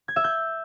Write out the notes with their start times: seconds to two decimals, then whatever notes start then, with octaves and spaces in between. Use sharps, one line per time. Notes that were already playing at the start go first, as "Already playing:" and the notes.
0.08 G#6
0.16 E5
0.24 G6